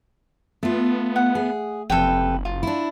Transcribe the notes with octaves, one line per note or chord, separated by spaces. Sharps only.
A3 B3 F4
F#5
G#4
F#1 F2 C3 A4 B4 G5
F4
D4 E4